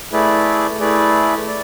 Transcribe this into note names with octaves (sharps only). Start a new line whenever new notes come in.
A3 E4 G#4 B4 D5
A3 E4 G#4 B4 D5
D5